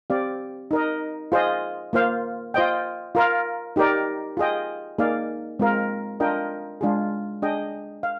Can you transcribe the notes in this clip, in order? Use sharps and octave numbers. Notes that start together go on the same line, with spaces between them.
C4 G4 D5 F5
D#4 A#4 D#5
F4 G#4 C5 D#5
A#3 F4 C5 F5
F4 C5 D#5 G5
F4 A#4 F5
D#4 G4 A#4 D5
F4 G#4 D#5 G5
A#3 D#4 G#4 D5 F5
G#3 C4 F4 A#4 F5
D4 F4 A#4 D#5 G5
G#3 D4 F4 G#4
D4 G#4 D#5 G5
F5